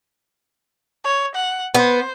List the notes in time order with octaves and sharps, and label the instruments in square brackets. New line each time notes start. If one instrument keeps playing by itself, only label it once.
[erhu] C#5
F#5
[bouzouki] B3 [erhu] C5